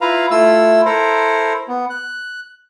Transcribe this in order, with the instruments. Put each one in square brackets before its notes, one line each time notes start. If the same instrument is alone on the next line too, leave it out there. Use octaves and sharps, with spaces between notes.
[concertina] E4 F4 B4 F5 A#5
A3 E4 F4 E6
E4 A4 A#4 C5
B3
F#6